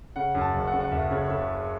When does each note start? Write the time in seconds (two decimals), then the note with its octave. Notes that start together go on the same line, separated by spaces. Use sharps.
0.16 C#3 F#5
0.35 F#2
0.41 A5
0.54 F#1
0.67 F#5
0.73 C#3
0.80 F#5
0.92 F#1 E5
1.11 C#3 C#5
1.24 C#5
1.30 C#3 E5